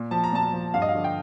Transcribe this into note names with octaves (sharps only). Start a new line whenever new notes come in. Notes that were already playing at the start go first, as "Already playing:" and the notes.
Already playing: A#2
F3 A5
A#5
A#2 A5
F3
G2 F5
D#5
F5
D3 F3
G5